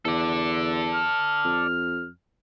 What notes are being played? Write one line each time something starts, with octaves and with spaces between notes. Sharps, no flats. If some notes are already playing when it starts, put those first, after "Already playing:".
E2 A4 D5
F6
F2